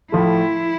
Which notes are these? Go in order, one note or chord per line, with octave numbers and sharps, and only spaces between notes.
A2 F3 A3 E4